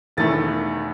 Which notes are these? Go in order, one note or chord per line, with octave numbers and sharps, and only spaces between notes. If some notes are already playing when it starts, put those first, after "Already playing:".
E1 E2 D#3 A3 A6